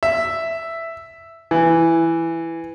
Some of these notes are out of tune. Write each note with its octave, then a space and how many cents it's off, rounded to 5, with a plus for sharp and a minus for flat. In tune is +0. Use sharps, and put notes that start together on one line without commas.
E5 +5
E3 +5